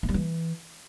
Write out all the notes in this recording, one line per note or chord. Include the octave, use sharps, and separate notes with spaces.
A3
G3
E3